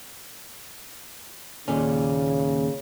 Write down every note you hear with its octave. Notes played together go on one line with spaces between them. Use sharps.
D#2 A#2 C#3 C#4